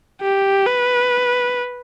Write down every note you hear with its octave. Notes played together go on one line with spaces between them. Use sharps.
G4
B4